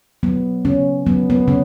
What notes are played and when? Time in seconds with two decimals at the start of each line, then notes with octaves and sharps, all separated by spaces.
0.23 F#3 B3
0.65 C#3 C#4
1.06 F#3 B3
1.30 B3
1.48 C#3 C#4